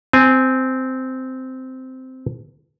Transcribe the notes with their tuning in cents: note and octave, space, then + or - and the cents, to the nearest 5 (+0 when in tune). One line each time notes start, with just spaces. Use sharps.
C4 -10 G#5 +0